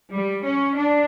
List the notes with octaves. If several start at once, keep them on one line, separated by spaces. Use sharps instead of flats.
G3
C#4
D4